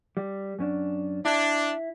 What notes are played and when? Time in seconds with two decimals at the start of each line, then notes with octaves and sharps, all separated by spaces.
0.17 G3
0.59 F#2 C#4 D4
1.25 D4 E4